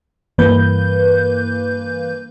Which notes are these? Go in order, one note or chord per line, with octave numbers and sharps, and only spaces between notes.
G2 E3 A#3 B4 G6